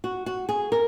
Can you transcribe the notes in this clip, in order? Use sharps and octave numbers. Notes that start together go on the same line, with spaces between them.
F#4
F#4
G#4
A#4